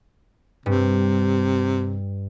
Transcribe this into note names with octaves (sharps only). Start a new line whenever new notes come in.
G2 C3